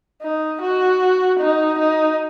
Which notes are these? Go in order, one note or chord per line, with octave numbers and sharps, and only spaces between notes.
D#4
F#4
D#4
D#4